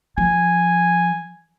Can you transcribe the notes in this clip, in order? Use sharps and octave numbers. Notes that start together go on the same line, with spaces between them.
F3 G#5